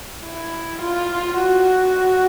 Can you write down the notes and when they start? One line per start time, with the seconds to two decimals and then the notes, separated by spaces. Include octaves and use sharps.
0.24 E4
0.82 F4
1.39 F#4